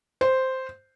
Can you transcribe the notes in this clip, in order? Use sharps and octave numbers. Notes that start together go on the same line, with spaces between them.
C5